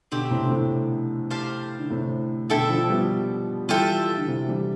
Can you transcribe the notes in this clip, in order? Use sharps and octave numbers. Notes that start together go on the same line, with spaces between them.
B2 D3 C4 G4 C5
A2 C3
D3
A2 C3
G4 C5 F5 A5
D3
A2 C3
B2 D3 E4 A4 E5 G5
D3 F3
G3 B3
E3 G3 F4 A4 E5 G5
D3
C3 E3
E3 G3